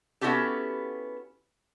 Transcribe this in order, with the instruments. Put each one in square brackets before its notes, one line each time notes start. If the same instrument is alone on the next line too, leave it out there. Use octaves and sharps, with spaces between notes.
[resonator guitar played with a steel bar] B3 C#4 E4 F#4 G4 A4